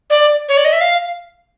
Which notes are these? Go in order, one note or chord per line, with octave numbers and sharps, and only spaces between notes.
D5
C#5
D5
D#5
E5
F5